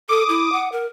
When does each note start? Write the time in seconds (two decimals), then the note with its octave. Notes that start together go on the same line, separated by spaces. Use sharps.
0.09 A4 D6 D#6
0.29 E4
0.52 F#5
0.72 A#4